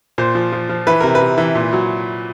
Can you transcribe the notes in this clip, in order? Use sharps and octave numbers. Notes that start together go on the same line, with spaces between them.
A#2 C5
F3
F3
F3
E3 B4
C3 A#4
B4
C3
E3
A#2
F#3